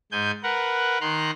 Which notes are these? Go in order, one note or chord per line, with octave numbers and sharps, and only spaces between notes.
G#2 G#5 G6
A#4 B4 F#5
D#3 A#5 C6 F#6